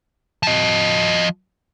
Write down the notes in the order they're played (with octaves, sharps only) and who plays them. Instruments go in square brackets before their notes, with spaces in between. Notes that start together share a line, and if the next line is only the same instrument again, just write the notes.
[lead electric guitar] F3 D#5